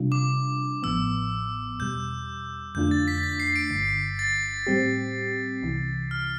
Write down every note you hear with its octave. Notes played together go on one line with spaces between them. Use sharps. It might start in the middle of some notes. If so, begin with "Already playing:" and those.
Already playing: C3 G3 D4 F4
D6
A1 A2 F3 B3 E6
E2 B2 G3 G6
F2 D3 A3 D4 F4 G6
A6
B6
A6
B6
C7
D7
G1 G2 D3
A6
A2 G3 C4 G4
C2 C3 E3
F6